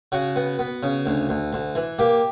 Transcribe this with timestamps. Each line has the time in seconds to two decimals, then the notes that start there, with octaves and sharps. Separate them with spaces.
0.12 C#3 F#4
0.36 B3
0.59 B3
0.83 C#3
1.06 D2
1.29 D2
1.53 D2
1.75 E3
1.99 A#3 G4